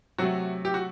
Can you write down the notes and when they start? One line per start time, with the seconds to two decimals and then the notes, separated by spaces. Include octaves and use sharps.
0.18 C3 F#3 A3 F#4
0.65 G4
0.74 F#4